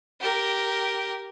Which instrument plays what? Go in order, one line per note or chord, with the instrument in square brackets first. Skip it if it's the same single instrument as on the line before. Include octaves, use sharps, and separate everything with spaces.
[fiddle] G4 A#4